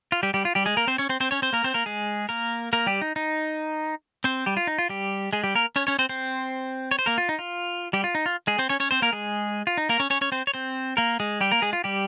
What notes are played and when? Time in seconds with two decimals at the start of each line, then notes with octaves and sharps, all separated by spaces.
0.12 F4
0.23 G3 G4
0.34 G3 G4
0.45 F4
0.55 G3 G4
0.66 G#3 G#4
0.77 A#3 A#4
0.87 C4 C5
0.98 C#4 C#5
1.09 C4 C5
1.20 C4 C5
1.31 C#4 C#5
1.42 C4 C5
1.53 A#3 A#4
1.64 C4 C5
1.74 A#3 A#4
1.86 G#3 G#4
2.29 A#3 A#4
2.73 A#3 A#4
2.87 G3 G4
3.02 D#4
3.16 D#4
4.24 C4 C5
4.46 G3 G4
4.57 F4
4.67 D#4
4.79 F4
4.89 G3 G4
5.33 G#3 G#4
5.44 G3 G4
5.55 A#3 A#4
5.76 C#4 C#5
5.87 C#4 C#5
5.99 C4 C5
6.09 C4 C5
6.91 C#5
6.99 C5
7.06 A#3 A#4
7.18 F4
7.29 D#4
7.39 F4
7.93 G3 G4
8.04 F4
8.15 D#4
8.26 F4
8.47 G#3 G#4
8.59 C4 C5
8.69 C#4 C#5
8.80 C#4 C#5
8.91 C4 C5
9.02 A#3 A#4
9.13 G#3 G#4
9.67 F4
9.78 D#4
9.89 A#3 A#4
10.00 C#4 C#5
10.10 C#4 C#5
10.21 C#4 C#5
10.32 C4 C5
10.47 C#5
10.54 C4 C5
10.97 A#3 A#4
11.20 G#3 G#4
11.41 G3 G4
11.52 A#3 A#4
11.62 G#3 G#4
11.73 F4
11.84 G3 G4